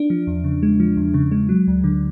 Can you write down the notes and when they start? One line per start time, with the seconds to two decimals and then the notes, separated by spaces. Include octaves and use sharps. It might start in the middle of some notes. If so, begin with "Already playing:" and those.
Already playing: D4
0.10 F3
0.27 E2
0.44 C#3
0.63 G#3
0.80 F3
0.97 E2
1.14 C#3
1.32 G#3
1.49 F#3
1.67 D2
1.84 D3